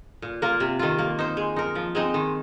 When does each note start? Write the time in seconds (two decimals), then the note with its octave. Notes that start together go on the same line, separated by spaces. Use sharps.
0.22 A#2
0.42 A#3 F4 A#4
0.60 C3
0.79 D#3 C4 F4
0.99 A#3
1.19 D#4 C5
1.37 G#3
1.56 D#4 A#4
1.75 F3
1.95 G#3 C4 D#4
2.14 D#3